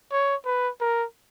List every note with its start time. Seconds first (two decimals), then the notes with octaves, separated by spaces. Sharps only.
0.11 C#5
0.45 B4
0.80 A#4